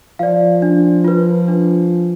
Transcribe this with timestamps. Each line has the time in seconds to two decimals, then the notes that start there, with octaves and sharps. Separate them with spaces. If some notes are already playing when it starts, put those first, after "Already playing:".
0.19 F3 D5 F5
0.62 D4
1.04 F4 B4
1.48 D4